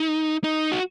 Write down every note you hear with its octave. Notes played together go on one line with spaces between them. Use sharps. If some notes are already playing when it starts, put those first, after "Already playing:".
Already playing: D#4
D#4
F#4